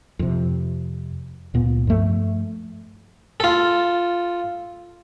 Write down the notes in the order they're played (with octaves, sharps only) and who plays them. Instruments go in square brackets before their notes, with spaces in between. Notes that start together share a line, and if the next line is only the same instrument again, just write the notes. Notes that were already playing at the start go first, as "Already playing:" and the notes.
[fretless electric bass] F2 C3
C#2 A#2 B3
G2 F3 A3
[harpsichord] F4 A4